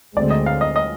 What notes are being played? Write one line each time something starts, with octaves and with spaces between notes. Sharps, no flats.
D2 D3 G#3 C4 D5
D#5
F5
D#5
D#5